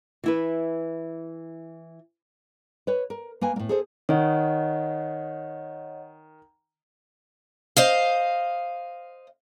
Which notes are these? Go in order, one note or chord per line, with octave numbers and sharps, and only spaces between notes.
E3 E4 B4
B4 C#5
A#4
A#3 B4 G#5
A2 A#3
G#4 A4 C5
D#3 C#5 D#5 F#5
C5 D#5 F5